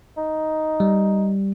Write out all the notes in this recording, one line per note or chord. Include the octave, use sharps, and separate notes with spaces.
D#4
G3